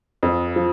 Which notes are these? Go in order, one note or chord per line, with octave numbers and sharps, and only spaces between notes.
F2
F3